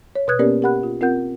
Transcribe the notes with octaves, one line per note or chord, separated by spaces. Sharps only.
C#5
B2 B4 D#6 F#6 G#6
A#3 B3 C#4 G4 A#4 D5
G4 A#4 F#5 B5 F#6
F4
C4 F4 A#4 F#5 G6